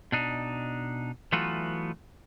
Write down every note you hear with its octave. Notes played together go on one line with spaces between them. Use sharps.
B2 D4 D#4
E3 F#3 A3 B3 F4 F#4